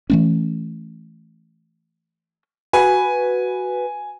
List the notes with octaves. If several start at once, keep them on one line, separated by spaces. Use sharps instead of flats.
E3 A3 C#4
F#4 B4 G#5